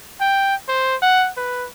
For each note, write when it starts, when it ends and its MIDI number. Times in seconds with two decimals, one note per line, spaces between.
0.21 0.55 79
0.68 0.96 72
1.02 1.29 78
1.37 1.67 71